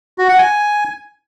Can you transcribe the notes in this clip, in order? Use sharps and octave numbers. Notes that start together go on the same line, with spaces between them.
F#4
F#5
G#5